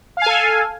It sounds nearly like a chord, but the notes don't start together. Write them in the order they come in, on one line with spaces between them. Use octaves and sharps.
F5 G#5 A4